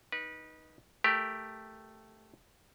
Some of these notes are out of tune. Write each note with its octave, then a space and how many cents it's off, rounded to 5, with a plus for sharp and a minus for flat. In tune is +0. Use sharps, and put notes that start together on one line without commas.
D#4 +0 B4 -25
A3 +0 G4 +5 A#4 +0